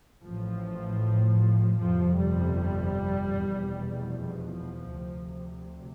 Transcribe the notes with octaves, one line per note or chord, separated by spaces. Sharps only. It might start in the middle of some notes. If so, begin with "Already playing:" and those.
A1 A2 F3
G1 F2 C3 F3
G3
F1 E2 B2
F3
D2 C3